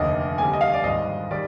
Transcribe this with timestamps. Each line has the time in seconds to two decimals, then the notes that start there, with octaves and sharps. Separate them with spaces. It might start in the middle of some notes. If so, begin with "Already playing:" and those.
Already playing: F1 D#2 D3 D#5
0.38 D#2 D3 G3 G#5
0.53 D#5
0.61 F5
0.74 D5
0.84 G#1 G2 D#3 D#5
1.31 D#3 G3 D5